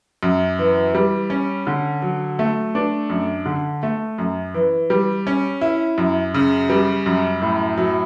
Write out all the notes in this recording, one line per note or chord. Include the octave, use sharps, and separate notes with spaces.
F#2
E3
G3
C#4
D3
F#3
A3
D4
F#2
D3
A3
F#2
E3
G3
C#4
E4
F#2
C#3
G3
F#2
A2
F#3